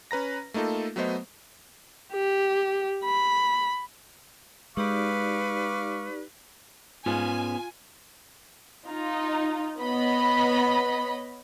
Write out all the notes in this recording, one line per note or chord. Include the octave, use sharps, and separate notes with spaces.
C#4 B4 A#5 A#6
A3 A#3 D#4 F4 A4
F#3 A3 B3 C5 D#5
G4
B5
G#3 D#4 G4 B4 D5 F5 C#6 D6
G#2 B3 C#4 F4 G#5
D#4 F4
B3 C#5 D#5 B5